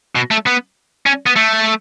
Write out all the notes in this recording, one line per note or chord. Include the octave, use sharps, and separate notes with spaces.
B2
A3
B3
C#4
B3
A3